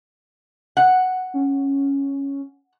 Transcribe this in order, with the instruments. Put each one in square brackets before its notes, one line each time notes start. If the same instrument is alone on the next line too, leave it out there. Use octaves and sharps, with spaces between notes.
[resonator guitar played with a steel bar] F#5
[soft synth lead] C#4